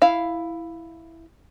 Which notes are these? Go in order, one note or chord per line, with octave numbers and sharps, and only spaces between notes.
E4 F5